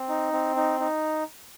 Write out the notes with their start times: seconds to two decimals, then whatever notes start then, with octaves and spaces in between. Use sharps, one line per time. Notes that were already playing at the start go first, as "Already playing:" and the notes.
Already playing: C4
0.09 D#4
0.33 C4
0.56 D#4
0.80 D#4